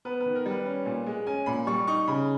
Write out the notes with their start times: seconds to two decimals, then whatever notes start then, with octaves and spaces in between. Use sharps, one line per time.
0.05 B3 B4
0.20 B4
0.26 D#3
0.35 A#4
0.46 G3
0.51 B4
0.66 C#4
0.86 A#2
1.06 G#3
1.27 C#4 G#5
1.46 A#2 B5
1.67 G3 C#6
1.87 D#4 C#6
2.07 C#3 B5